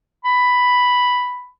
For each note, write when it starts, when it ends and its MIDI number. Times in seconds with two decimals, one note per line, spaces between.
0.25 1.48 83